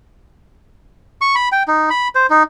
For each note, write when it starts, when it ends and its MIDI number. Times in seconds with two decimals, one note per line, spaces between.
1.21 1.35 85
1.35 1.49 83
1.52 1.63 79
1.68 1.89 63
1.90 2.08 83
2.15 2.27 72
2.30 2.43 63